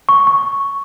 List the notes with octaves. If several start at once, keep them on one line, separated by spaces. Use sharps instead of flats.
C#6
C#6